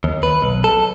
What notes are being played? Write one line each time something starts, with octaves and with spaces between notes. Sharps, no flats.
D#2
B4
B1
A4